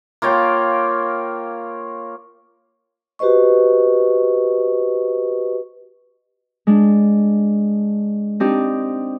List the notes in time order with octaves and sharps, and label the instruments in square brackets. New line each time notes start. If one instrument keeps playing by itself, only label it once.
[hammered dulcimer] A#3 F4 C#5 G5
[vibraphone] F#4 G4 B4 C5 D#5 C#6
[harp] G#3 D4
C4 D4 D#4 G4